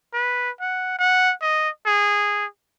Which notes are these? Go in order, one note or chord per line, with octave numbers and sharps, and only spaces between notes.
B4
F#5
F#5
D#5
G#4